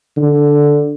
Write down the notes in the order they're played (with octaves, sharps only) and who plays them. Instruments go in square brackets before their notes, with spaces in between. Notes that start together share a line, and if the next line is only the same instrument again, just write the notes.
[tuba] D3